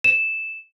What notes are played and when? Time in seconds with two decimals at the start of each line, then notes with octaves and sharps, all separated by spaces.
0.04 E7